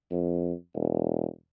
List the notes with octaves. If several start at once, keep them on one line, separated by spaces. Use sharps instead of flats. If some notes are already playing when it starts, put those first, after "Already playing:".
F2
E1